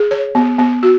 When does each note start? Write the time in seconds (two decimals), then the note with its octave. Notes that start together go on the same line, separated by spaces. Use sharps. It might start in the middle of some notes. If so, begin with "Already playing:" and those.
Already playing: G#4
0.11 C#5
0.35 B3
0.59 B3
0.83 F#4